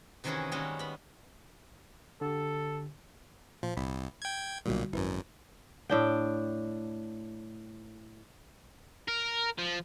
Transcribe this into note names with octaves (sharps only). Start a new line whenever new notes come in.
C3 D#3 E3 C#4 F#4 G#4
D#3 G3 G#3 A#3 C#4 F#4
B3 B5
D3 G4 A4
A#2 F3 C5
C2 B5
G5 G#6
B1 A#2 D3 G3 F#4
G#1 F#2 E4 B4
A2 D4 G5
A#4
F3